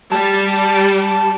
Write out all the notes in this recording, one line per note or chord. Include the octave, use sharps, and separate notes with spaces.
G3 A5